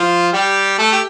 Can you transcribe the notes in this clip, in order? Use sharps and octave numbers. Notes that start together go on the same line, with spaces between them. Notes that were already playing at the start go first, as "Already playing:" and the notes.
Already playing: F3 F4
G3 G4
A3 A4
G4